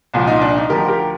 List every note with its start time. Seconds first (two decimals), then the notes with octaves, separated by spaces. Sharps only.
0.14 C2 A#2 F3
0.27 D#4
0.42 D4
0.56 D#4
0.70 D2 D3 F3 G4 A#4
0.88 G4 A#4